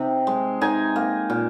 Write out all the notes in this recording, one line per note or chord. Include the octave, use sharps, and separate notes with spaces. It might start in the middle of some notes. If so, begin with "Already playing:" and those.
Already playing: C3 D#4
G#3
D#4 G#5
A#3
A#2